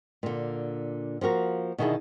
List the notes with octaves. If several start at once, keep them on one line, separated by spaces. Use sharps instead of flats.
A#2 D3
F3 A#3 F#4 A#4
B2 D3 D#3 E4 G#4 A4